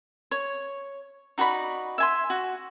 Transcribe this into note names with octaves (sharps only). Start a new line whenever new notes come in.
C#5
D#4 F#4 D5 B5
E5 G#5 C6
F#4